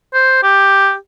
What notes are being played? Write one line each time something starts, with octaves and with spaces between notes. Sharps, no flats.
C5
G4